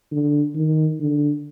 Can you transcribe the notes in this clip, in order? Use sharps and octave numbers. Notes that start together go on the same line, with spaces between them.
D3
D#3
D3